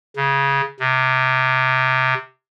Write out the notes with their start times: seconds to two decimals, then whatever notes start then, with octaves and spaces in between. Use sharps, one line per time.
0.16 C#3
0.80 C3